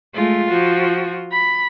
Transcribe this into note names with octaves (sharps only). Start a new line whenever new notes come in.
G#3 A3 F4
F3 F#4
B5